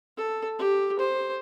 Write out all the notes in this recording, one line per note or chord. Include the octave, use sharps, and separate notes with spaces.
A4
G4
C5